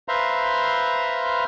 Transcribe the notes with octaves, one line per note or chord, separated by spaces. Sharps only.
B4 C5 E5 F5 A#5 C6